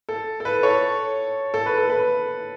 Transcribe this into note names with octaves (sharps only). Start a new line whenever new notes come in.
A4
A4
B4
A4 C#5
A4
B4
A4
B4